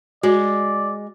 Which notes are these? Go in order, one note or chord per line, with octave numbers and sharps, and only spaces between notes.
G#3 F#4 D5